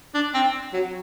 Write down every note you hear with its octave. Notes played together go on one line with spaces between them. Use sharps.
D4
C4
F#3